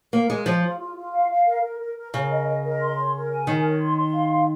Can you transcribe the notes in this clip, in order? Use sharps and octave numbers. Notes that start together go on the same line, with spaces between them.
A#3 A#4
G#3 F4
F3 F4
F4
F4
F4
F5
F5
A#4
A#4
A#4
A#4
C#3 A#4
D#5
D#5
A#4
C6
C#5
A#4
G#5
D#3 A#4
C#5
C6
C6
F5
C6